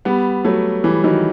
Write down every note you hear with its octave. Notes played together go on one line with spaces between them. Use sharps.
G3 B3
F#3 A3
E3 G3
D#3 F#3